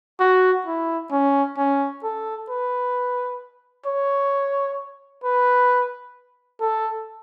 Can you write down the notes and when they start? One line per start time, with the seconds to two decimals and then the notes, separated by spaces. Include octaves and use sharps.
0.20 F#4
0.66 E4
1.11 C#4
1.57 C#4
2.03 A4
2.49 B4
3.86 C#5
5.24 B4
6.61 A4